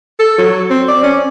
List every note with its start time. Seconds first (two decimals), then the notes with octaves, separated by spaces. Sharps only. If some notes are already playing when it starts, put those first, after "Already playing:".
0.19 A4
0.38 F#3
0.70 C4
0.88 D5
1.03 C#4